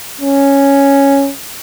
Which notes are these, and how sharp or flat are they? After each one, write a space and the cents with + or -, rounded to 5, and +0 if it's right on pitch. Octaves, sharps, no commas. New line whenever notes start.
C#4 +0